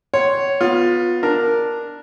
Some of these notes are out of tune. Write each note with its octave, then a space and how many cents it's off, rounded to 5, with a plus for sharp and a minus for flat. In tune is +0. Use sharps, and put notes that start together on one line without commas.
C#5 +0 F#5 +35 C6 +0
B3 +0 F4 +20
D4 +0 A#4 +0